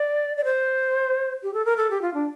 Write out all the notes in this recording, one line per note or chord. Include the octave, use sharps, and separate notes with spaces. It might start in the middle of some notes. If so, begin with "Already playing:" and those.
Already playing: D5
D5
C5
G4
A4
A#4
A4
G4
F4
D4